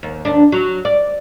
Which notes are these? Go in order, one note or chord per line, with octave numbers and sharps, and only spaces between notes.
D#2
D#2 D4
F#3
D5